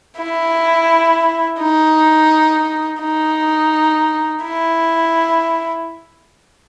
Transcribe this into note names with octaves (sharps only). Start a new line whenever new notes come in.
E4
D#4
D#4
E4